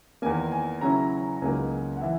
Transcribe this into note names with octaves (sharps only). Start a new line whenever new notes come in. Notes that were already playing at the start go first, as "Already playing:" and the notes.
E2 D#3 A#3 G#5
G#5
C#3 F#3 C#4 E4 A#5
A#5
C#2 C#3 F#3 A#3 D#4 G#5
F#5
E3 E5